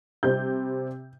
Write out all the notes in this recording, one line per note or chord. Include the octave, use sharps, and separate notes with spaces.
C3 G3 C4 G6